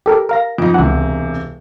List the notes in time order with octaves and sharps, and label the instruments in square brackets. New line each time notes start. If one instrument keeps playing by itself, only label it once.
[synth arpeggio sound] G4 A4 A#4
A#4 F5 A#6
[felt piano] F2 D#4 [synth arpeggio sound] D7
[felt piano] E1 C3 [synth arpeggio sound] C#2 F#5